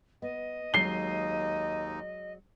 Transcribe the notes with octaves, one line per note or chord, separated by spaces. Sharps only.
B3 D#5
D#2 F#3 G#3 D#4 C7 G7